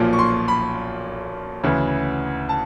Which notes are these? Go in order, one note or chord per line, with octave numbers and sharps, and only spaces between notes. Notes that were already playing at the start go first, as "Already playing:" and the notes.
Already playing: B1 A#2 F3
C#6
C6
B5
D2 C#3 E3
A5